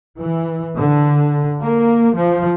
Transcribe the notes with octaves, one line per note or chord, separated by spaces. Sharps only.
E3
D3
A#3
F3